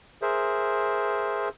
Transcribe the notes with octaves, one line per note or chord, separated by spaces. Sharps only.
G#4 A#4 C5 E5